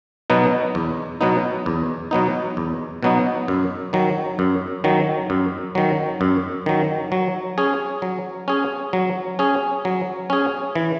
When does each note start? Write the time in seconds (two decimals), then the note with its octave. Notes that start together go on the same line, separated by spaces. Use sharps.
0.30 B2 F#3 B3 D#4
0.75 E2
1.21 B2 F#3 B3 D#4
1.66 E2
2.11 B2 F#3 B3 D#4
2.57 E2
3.03 B2 F#3 B3 D#4
3.48 F#2
3.93 D#3 F#3
4.39 F#2
4.84 D#3 F#3
5.30 F#2
5.75 D#3 F#3
6.21 F#2
6.66 D#3 F#3
7.12 F#3
7.58 C#4 G#4
8.02 F#3
8.48 C#4 G#4
8.93 F#3
9.39 C#4 G#4
9.85 F#3
10.30 C#4 G#4
10.75 E3